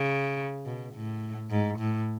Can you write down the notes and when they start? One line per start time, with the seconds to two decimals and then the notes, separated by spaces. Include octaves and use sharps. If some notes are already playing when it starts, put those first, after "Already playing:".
Already playing: C#3
0.66 B2
0.94 A2
1.50 G#2
1.79 A2